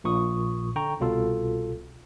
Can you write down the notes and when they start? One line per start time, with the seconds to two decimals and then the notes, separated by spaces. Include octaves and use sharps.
0.04 A#1 A#2 C#6 D#6
0.76 D3 G5 A#5 C#6
1.00 C2 B2 F4 A4